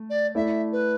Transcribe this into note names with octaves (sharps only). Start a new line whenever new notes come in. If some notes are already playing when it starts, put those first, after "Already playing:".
Already playing: A3
D5
A3 E4 A4 D5 E5
B4